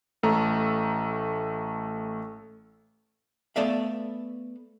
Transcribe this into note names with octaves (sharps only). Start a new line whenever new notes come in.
A1 A3 A4 A#5 E6
A3 B3 A4 D5 E5 F5